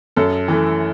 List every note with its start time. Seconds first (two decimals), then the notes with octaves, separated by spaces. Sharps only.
0.16 F#2 A4
0.48 E3 A3